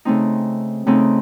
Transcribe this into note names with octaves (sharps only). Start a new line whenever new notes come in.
C#3 A3 C4 D#4
C#3 A3 C4 D#4